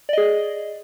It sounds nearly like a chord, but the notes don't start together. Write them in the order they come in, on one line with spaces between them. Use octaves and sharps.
D5 D#5 G#4